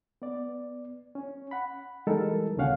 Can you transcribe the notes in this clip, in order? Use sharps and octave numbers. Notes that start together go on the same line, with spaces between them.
B3 D5
C#4
F#5 B5
E3 G3 G#3 D#4 A4 A#4
C#2 B2 D3 C#4 F5 F#5